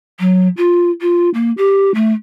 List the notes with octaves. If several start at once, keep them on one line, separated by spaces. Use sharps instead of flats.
F#3
F4
F4
A#3
G4
A3